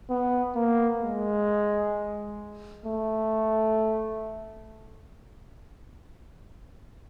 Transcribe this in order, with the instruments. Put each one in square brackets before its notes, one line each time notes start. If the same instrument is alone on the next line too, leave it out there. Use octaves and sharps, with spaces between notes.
[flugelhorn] B3
A#3
G#3
A3